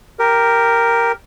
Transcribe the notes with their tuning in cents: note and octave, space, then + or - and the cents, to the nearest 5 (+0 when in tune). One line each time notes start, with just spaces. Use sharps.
G4 +0 A#4 +0